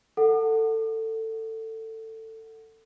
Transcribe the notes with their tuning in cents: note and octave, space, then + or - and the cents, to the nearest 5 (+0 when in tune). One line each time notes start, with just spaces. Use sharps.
A4 +20 F#5 +0